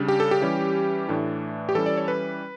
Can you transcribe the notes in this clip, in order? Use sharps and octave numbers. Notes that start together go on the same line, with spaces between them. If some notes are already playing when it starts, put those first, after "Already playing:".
Already playing: C#3 G3 D4
G4
A4
G4
E3 G3 C#4
A2 E3 A3 D4
G4
E3 G3 C#4 A4
D5
C#5
B4